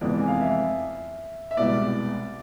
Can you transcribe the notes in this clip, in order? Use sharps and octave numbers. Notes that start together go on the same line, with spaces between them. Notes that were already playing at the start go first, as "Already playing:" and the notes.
F1 F2 E3 G#3 B3 D5
G#5
F5
E5
E5
C2 B2 G#3 B3 E4 D5